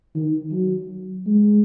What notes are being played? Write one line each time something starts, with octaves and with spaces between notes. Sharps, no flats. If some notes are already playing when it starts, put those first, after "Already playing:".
D#3
F#3
G#3